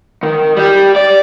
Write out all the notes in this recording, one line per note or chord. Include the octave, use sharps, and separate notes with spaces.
D#3
G3 G4
D5